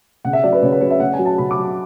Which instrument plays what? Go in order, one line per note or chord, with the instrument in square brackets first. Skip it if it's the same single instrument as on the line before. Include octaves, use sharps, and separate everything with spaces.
[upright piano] C#3 F#5
E5
F#3 D5
B4
C#3 C#5
B4
F#3 C#5
E5
C#3 F#5
G#5
F#3
A5
C#3 B5
D6
F#3